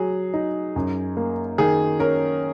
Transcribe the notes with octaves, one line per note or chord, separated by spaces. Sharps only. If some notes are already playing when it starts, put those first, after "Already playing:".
Already playing: F#3 G#4
D#4
F#2
A#3
D#3 G#4
C#4 A#4